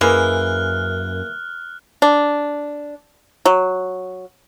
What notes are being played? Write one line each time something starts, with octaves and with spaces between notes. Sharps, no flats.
F#2 E3 G#3 A#3 F6 F#6
D4
F#3